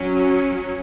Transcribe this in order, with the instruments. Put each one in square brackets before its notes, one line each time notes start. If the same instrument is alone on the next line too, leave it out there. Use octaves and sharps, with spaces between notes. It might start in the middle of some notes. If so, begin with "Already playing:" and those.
Already playing: [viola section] F#3 C#4